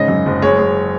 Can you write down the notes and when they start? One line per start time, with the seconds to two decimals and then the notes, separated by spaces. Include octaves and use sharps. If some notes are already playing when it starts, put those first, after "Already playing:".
Already playing: G#2 C#3 D#5
0.08 F#2
0.26 F#1
0.42 G#3 C#5
0.59 G#3